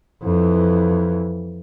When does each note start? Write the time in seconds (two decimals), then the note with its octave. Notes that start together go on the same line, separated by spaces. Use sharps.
0.23 F2 E3